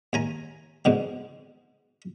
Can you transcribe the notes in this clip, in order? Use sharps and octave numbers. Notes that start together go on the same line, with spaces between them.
D#2 G#5 A#5
G#2 B2 D3